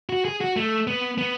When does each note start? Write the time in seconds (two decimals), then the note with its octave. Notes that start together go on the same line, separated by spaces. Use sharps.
0.09 F#4
0.25 G#4
0.41 F#4
0.57 A3
0.87 B3
1.18 B3